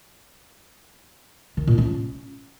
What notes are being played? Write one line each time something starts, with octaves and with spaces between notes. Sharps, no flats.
D#3
A#2
C#4